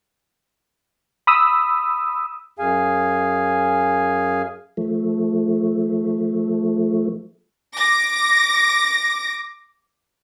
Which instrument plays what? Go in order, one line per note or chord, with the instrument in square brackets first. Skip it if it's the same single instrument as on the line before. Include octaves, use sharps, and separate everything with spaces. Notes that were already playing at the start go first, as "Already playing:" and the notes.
[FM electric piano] B5 D#6 E6
[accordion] F#2 G#4 F5 G#5
[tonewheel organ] F3 A3
[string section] D6 A#6